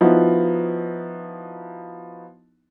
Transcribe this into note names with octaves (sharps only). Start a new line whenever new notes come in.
F3 B3 D#4 E4 F#4